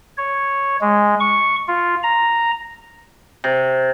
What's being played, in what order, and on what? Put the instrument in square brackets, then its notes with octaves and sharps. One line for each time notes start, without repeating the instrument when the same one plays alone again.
[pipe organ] C#5
G#3
C#6
F4
A#5
[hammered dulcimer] C3